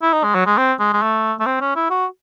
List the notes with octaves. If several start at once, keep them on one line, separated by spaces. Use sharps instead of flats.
E4
D#4
G#3
F#3
G#3
C4
G#3
G#3
A3
A3
C4
C#4
E4
F#4